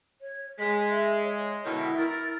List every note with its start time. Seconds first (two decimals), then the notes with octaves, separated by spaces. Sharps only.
0.21 C#5
0.59 G#3 B6
0.90 E5
1.23 C#5
1.65 B2 D3 D#3 E4
1.98 E4 A#4 A6